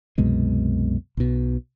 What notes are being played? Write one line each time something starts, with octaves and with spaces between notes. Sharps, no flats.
C2 F#2 B2 G#3
B1 B2